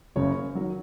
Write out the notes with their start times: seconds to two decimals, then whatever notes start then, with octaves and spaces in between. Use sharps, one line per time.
0.16 F#1 F#2 C#3 C#5
0.55 D#3 F#3